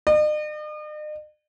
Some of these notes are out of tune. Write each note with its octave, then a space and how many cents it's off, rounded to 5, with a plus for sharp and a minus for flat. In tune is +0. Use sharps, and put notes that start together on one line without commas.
D#5 -45